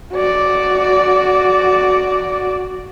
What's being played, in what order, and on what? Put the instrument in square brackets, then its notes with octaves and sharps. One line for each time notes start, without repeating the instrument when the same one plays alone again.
[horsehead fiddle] F#4 D5